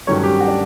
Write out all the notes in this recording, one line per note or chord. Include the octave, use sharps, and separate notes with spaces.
G2 D#3 F#3 A3 C#4 C#5
G4
F#4
D4